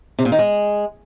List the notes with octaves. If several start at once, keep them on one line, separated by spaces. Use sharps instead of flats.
C3
A#2
D#3
G#3